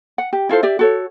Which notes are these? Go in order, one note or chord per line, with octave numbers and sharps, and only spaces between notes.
F#5
G4
E4 F4 A4 C5
G4 D5 E5
F#4 A4 C#5